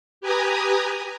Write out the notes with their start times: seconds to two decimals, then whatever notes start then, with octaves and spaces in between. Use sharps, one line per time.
0.21 G4 B4 G#5 A#5 D#6